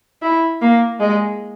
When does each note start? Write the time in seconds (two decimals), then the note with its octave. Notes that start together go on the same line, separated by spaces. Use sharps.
0.22 E4
0.61 A#3
1.00 G#3